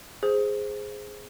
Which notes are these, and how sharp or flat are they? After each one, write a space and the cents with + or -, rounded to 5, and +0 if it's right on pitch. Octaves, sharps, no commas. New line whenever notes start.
G#4 +0 C5 -5